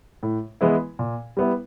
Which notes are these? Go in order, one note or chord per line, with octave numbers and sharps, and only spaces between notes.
A2
E3 G#3 B3 E4
A#2
G3 B3 E4